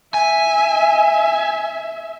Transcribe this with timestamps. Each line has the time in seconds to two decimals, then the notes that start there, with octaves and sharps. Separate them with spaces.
0.14 E5 G#5